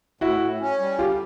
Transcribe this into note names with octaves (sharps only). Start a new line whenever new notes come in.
A2 E4 F#4
A2
C#4
G3
D3 F4 G4